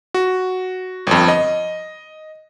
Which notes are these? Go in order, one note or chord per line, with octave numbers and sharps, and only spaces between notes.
F#4
G1 F2
D#5